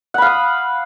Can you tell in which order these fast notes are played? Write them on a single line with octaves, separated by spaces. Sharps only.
F#5 B5 F5 D#6